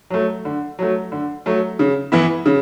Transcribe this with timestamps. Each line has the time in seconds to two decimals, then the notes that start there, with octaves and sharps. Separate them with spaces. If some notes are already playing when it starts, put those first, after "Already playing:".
0.10 F#3 A3
0.45 D3
0.79 F#3 A3
1.12 D3
1.46 F#3 A3
1.79 C#3
2.12 E3 B3 E4
2.46 C#3